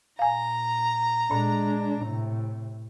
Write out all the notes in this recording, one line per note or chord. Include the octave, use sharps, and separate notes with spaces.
A#2 F5 G#5 A#5
A#2 G#3 D4
A2 C3